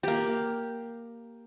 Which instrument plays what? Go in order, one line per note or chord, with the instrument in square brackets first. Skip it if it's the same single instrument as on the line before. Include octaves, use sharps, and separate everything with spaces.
[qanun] A#3 G4